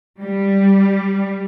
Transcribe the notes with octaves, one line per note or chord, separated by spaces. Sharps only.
G3